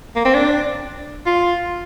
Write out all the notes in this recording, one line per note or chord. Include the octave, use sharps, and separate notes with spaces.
A#3
C4
D4
F4